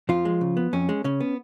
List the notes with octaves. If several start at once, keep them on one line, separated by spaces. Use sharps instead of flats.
F2 F3 F4
G#3
C#3
B3
F2 C#4
G#3
C#3 C#4
B3